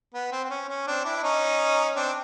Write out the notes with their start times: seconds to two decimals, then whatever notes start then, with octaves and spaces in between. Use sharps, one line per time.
0.14 B3
0.32 C4
0.44 C4
0.50 C#4
0.69 C#4
0.87 C4 D4
1.05 D4 E4
1.16 E4
1.23 C#4 D#4
1.96 C4 D4